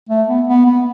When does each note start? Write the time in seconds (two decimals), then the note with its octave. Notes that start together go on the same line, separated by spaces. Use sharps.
0.09 A3
0.28 B3
0.48 B3
0.66 B3